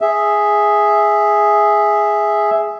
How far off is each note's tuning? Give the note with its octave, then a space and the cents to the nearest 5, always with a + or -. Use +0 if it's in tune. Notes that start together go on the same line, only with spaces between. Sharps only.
G#4 +0 E5 +0